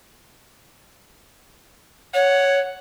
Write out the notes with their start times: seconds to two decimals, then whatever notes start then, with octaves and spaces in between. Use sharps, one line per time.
2.14 C#5 F#5